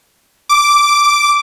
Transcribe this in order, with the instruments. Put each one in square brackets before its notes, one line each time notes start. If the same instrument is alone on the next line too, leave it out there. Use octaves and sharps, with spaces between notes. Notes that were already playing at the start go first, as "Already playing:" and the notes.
[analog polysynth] D6